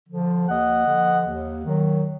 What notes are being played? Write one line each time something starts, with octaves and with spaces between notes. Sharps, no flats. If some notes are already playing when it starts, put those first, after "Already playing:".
D3 F3
D#2 D#5 F#5
D3 F3
D#2
D#3 F#3